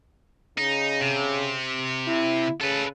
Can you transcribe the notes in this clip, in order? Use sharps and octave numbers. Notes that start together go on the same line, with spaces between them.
C#3 D#4
C3
E4
C#3 A4 B4